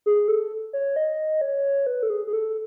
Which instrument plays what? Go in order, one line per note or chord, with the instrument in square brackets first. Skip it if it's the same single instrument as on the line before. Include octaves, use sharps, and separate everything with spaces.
[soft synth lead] G#4
A4
C#5
D#5
C#5
B4
A4
G#4
G#4
A4